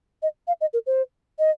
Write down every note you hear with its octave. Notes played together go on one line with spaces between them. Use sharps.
D#5
F5
D#5
A#4
C5
D#5